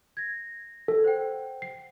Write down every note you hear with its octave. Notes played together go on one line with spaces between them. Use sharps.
G#6 A#6
A4
C5 F#5 G5
C7